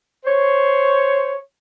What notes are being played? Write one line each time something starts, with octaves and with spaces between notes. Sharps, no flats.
C5 C#5